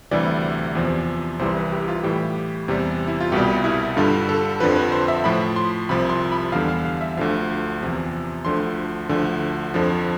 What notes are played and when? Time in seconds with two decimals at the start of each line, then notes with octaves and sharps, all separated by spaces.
0.11 D2 C3 E3 G3 D5
0.75 E2 C3 F3
1.39 C2 C3 E3 G3 C5
1.56 B4
1.72 G4
1.88 F4
2.03 A2 E3 G3 G4
2.68 E2 C3 G3
3.07 E4
3.20 F4
3.32 C2 B2 G3 G4
3.64 E4
3.97 G2 D3 G3 F4
4.29 A4
4.60 F2 D3 F3 B4
4.76 B4
4.92 C5
5.08 E5
5.24 A2 F3 B5
5.56 C6
5.89 C2 C3 F3 B5
6.09 C6
6.32 B5
6.52 E2 D3 G3 F5
6.68 F5
6.85 F5
7.01 E5
7.17 D2 D3 F3 F5
7.81 E2 C3 F3
8.45 D2 D3 F3 C6
9.09 D2 D3 F3
9.74 F2 D3 F3